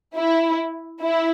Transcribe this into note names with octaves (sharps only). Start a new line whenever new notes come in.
E4
E4